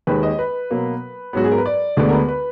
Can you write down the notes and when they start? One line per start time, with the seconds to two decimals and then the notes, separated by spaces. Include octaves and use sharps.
0.07 D#2 D#3 G#3 B4
0.23 D#5
0.39 B4
0.71 B2 F#3 A#3
1.33 G#2 F#3 B3 F#4
1.44 G#4
1.52 A#4
1.58 B4
1.66 D5
1.97 D2 D3 G#3 B3 D5
2.09 A#4
2.13 B4
2.29 B4